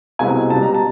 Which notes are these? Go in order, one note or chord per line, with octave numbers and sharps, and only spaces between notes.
C2 B2 G#3 C4 E4 G#5
C#2 B2 G3 A5
A#5
A5